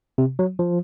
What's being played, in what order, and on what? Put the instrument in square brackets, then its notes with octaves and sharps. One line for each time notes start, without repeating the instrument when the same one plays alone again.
[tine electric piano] C3
F#3
F3